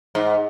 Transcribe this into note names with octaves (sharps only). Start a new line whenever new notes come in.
G#2